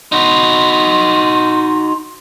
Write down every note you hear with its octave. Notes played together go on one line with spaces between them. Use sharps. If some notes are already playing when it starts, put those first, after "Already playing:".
D#4 F#4 C6